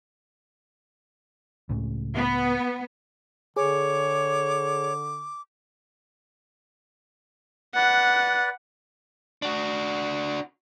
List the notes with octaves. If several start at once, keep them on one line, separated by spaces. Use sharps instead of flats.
C#2 A2 C#3
B3
D3 G#4 C#5 D6
B4 D5 F#5
D4 F#4